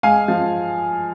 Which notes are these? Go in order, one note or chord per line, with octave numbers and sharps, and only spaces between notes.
G#3 F5 G#5
F3